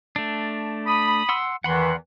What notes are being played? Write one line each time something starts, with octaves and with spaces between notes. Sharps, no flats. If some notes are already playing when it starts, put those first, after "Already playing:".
A3 D4
B5 D#6
F#5 C6 E6
E2 D#3 E3 F#5 B5 C6